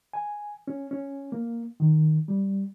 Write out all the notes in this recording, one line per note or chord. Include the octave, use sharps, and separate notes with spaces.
G#5
C#4
C#4
A#3
D#3
G3